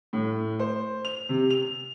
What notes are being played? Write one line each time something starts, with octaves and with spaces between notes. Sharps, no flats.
A2
C5
F7
C3
F7